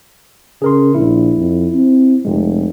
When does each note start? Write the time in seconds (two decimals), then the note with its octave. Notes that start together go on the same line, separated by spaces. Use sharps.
0.62 C#3 G#4 A#4 C6
0.95 A#1 E4
1.36 F2
1.74 C4
2.25 F1 C3 G#3